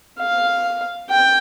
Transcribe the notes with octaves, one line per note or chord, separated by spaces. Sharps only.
F5
G5